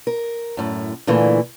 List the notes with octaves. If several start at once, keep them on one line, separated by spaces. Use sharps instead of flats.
A#4
F#2 A2
A#2 D3 E3 A3 A#3